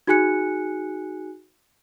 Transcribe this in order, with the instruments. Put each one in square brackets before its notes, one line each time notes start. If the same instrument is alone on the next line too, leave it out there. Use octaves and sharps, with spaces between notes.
[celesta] D#4 F#4 G#4 G#5 F#6 C#7